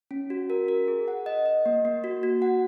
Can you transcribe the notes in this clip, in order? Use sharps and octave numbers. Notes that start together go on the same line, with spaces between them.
C#4
F#4
A#4
A#4
G#4
F#5
D#5
D#5
A#3
A#3
F#4
F#4
F#5